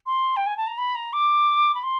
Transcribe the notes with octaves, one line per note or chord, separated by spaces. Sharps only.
C6
G5
G#5
A5
A#5
B5
A#5
D6
B5
C6